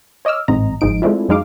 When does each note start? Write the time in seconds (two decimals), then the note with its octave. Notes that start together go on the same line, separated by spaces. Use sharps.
0.25 C#5 D#5 D6 E6 F6
0.48 A1 G#2 C4 D#5 A#5
0.81 G1 G#2 F3 D#4 D7
1.02 G#3 A3 C4 D4 E4 F4
1.29 F#2 F#3 G#3 D#4 F5 D6